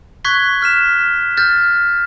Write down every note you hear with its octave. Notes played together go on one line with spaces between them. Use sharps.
C#6 F#6 G#6 B6 G7
F6 B6 E7
F6 G6 A6